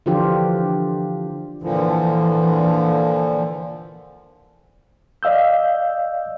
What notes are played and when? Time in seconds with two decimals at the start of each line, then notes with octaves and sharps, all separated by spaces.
0.06 D3 E3 F3 D4 F4 G4
1.63 A#2 D3 E3 F3
5.23 D5 D#5 F5 E6 G6